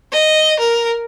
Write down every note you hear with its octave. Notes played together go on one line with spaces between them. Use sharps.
D#5
A#4